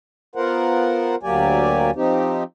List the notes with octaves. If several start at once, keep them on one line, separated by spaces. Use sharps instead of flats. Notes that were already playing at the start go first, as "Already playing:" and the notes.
B3 F4 A#4 C5 F#5
D2 F#3 A#3 G4 D5 G#5
F3 C4 D#4 G4